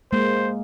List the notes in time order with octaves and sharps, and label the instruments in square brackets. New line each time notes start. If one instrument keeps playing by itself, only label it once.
[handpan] G#3 A#3 [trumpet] C5